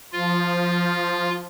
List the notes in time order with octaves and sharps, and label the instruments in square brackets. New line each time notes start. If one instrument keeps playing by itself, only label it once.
[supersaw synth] F3 [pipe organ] F4